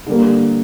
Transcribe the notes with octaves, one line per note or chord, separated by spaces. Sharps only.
D3 G3 A#3